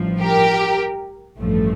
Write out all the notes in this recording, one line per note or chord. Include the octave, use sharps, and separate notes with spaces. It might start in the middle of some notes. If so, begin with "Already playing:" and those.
Already playing: A1 G2 F3
G4 A#4
A1 G2 F3 A3